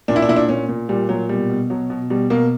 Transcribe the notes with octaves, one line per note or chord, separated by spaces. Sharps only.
A#2 D4
E4
D4
A#2 E4
D4
A#2 C#4
A#2
A#2 G3
A#2 F#3
B2 G3
B2
B2 F#3
B2
B2 G3
B2 A#3